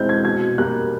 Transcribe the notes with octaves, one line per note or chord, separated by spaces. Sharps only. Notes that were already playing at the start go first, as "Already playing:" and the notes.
Already playing: B2 G#3 C4 E4 F6 G6
G#6
B2 G#6
G3 A#3 F#6